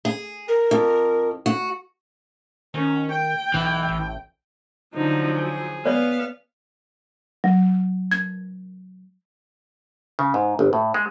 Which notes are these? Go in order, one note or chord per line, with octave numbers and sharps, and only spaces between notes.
G#4
A#4
F2
F#4
D#3 C#4
G5
B1 E3
A1
D3 F3 F#3 D#4
G#4
B3 C#5 D5 F5
F#3
G#6
C#3
G#2
G1
A2
G#3